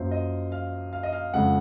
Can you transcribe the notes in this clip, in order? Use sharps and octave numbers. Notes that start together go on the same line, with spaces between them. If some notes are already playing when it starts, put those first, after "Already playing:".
Already playing: F#2 F3 A#3 C5
D#5
F5
F5
D#5
F5
F2 C#3 F3 G#3 F#5